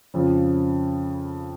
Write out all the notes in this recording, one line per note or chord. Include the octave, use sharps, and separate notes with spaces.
F2 C#3 F3